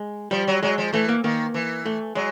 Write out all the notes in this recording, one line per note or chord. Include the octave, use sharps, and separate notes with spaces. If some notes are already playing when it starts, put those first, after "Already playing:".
Already playing: G#3
F3 G3
F#3
F#3 G#3
F3
E3 A3
A#3
D#3 A#3
E3
A3
F#3 G#3